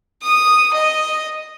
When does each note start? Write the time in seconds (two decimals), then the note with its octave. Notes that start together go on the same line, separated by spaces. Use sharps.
0.22 D#6
0.74 D#5